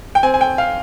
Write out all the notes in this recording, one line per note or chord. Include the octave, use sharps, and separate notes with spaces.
G5
C4 G#5
G#5
G5
F5